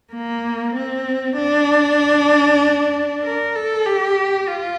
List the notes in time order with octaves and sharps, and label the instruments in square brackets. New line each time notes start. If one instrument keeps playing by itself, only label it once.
[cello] A#3
C4
D4
A#4
A4
G4
F4